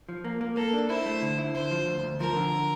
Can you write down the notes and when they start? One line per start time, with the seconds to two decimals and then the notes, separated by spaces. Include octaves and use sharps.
0.09 F3
0.24 A#3
0.41 A#3
0.57 A#3 A4
0.73 D4
0.90 E4 C5
1.06 A3
1.22 D3
1.39 E4
1.54 D3 C5
1.71 F3
1.87 D2
2.04 D2
2.20 F3 A#4
2.36 D3